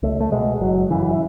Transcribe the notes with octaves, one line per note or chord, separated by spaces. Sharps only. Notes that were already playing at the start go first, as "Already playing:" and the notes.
C#2 A3
A3
B2 G#3
F#1 F#3
F#2 C#3 E3
E3